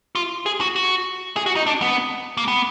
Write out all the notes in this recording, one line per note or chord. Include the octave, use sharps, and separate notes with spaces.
F4
G#4
F#4
F#4
G#4
F#4
D#4
D4
B3
A#3
B3